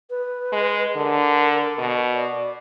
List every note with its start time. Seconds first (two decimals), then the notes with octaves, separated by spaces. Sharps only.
0.10 B4
0.52 G#3
0.96 D3 A#4
1.78 B2
2.15 D5